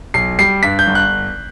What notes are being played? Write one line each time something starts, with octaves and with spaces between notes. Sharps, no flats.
B1 C7
G3 C7
G2 B6
G6
G1
F#6